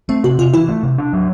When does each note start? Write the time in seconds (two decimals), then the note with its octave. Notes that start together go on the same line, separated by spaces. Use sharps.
0.09 A3 C4
0.24 C3 F#4
0.39 C3 F4
0.54 E3 E4
0.68 A3
0.83 C3
0.98 D4
1.13 F#3